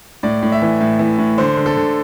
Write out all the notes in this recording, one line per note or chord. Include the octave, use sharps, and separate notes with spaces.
A2 D5
A2
E5
E3
A2
E3
A2
D3 C5
D3
A4
D3